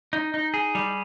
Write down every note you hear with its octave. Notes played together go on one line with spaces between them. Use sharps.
D#4
D#4
G#4
G3